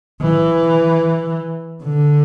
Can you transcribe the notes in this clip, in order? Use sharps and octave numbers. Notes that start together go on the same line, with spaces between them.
E3
D3